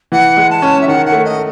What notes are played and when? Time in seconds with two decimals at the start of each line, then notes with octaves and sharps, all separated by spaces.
0.12 E3 F#5
0.37 G#3
0.50 A5
0.62 C#4
0.81 E5
0.88 D#3 F#5
1.06 F#5
1.12 A3
1.24 D#5